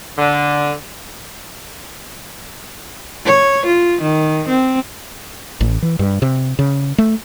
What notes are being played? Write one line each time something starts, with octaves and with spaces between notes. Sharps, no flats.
D3
C#5
F4
D#3
C4
A1
E3
G2
C3
C#3
A3